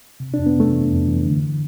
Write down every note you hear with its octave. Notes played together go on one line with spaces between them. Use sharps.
C3
F2 D4
B3
C3 A3
E3
F2
E3
D3